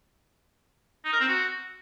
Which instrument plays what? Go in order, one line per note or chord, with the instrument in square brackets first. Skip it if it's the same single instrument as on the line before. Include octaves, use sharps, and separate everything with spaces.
[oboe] D#4
A#4
C4
F#4